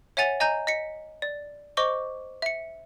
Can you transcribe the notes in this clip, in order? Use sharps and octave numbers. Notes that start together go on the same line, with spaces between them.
C#5 E5 F#5 G#5 A6 F7
D#5 G#5 A#5 G6
D#5 B6 C#7
D5
C5 D#5 C#6 D6 G7
E5 C#7